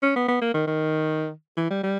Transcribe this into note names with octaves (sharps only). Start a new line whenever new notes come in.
C#4
B3
B3
A#3
D#3
D#3
E3
G3
G3